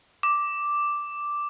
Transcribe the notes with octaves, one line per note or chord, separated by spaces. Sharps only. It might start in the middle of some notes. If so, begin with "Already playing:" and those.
D6